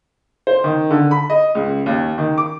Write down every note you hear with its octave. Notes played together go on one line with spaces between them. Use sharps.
C5
D#3
D3
B5
D#5
C#2
D#2
D#3
D6